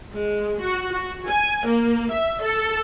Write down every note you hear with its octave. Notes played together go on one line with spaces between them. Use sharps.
G#3
F#4
F#4
G#5
A#3
E5
A4